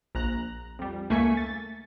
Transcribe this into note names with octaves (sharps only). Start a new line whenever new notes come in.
A#1 A#5 F#6
F2 G3
C#2 A3 A#3 G#5 C#6 B6
A6